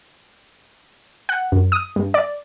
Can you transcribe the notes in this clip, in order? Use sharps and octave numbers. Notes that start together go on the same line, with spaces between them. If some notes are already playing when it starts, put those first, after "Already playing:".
F#5
F#2
D#6
G2
D5